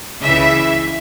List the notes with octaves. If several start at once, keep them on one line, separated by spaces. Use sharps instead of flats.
C#2 C#3 E3 E5